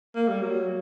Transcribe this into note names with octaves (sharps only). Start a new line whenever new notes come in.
A#3
G3
F#3